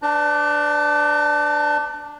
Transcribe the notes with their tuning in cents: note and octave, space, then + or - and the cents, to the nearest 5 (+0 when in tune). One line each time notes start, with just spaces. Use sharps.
D4 +0 B4 +45 A#5 -45